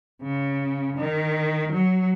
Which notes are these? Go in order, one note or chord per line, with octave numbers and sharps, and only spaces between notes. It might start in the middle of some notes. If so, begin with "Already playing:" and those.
C#3
D#3
F#3